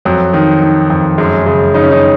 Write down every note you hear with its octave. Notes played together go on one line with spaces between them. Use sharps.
F2 F#3
D#3
D#3
F2
F#2 G#3
C#3
C#3 D#4
C#4
D#4